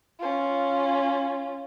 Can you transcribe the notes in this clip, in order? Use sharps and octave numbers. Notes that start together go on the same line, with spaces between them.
C#4 F4